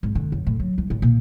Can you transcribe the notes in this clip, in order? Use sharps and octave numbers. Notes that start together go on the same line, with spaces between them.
G#1
D3
F#2
A2
F#3
C2
A1
A#2